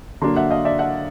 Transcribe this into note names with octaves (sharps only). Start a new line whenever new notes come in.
D3 F#3 A#3 D4 A#5 C6
E5 F#5
D#5 F5
D5 E5
E5 F#5